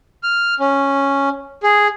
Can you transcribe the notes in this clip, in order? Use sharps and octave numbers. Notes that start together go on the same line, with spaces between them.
F6
C#4
G#4